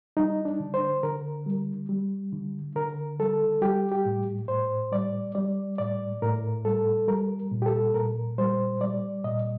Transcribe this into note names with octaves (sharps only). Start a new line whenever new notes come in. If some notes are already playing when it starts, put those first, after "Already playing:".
G3 D#4
D4
D3
C5
D3 A#4
G3
G3
D3
D3 A#4
G3 A4
G3 G4
G4
A2
A2 C5
G3 D5
G3 D5
A2 D5
A2 A#4
G3 A4
G3 A#4
A#2
G4
A4
A#2 A#4
G3 C5
G3 D5
A#2 D#5